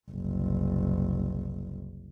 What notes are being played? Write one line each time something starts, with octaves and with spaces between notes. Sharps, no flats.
F#1 C2